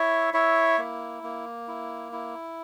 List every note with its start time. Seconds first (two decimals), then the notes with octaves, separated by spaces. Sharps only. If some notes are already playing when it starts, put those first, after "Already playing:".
Already playing: E4 C#5 E5
0.34 E4 C#5 E5
0.78 A#3
1.23 A#3
1.68 E4
2.12 E4